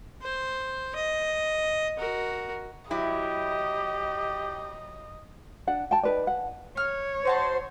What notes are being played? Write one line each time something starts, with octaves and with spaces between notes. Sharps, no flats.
C5
D#5
F#4 A#4
F#3 E4 G4 D#5
D4 F#5
G5 A5
D#4 B4 D5
F#5
C#5 F6
D#4 F#4 C5 A5